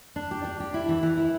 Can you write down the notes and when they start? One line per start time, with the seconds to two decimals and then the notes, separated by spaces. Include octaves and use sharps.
0.16 D4
0.31 G4
0.44 D4
0.60 G4
0.74 E4
0.89 E3
1.03 E3
1.17 E4